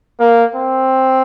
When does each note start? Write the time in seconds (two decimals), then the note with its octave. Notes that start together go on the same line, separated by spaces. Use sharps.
0.20 A#3
0.56 C4